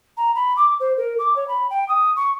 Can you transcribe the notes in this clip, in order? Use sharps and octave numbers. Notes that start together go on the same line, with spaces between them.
A#5
B5
D6
C5
A#4
D6
C#5
B5
G5
D#6
C#6